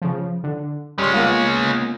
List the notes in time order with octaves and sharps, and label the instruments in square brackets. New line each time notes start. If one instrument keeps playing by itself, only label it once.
[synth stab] C#3 F3
D3
[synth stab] G3 C6 [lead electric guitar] G#3 C#4
[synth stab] A#3 B3 F4